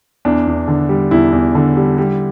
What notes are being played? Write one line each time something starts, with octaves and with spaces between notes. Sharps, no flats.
E2 D4
E2
D3
G3
E2 E4
E2
D3
G3
G3